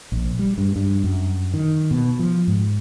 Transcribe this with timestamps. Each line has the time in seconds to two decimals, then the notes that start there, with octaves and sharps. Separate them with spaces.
0.12 A#1
0.39 G3
0.58 G2
0.76 G2
1.04 F#2
1.54 D#3
1.91 B2
2.19 F3
2.47 G#2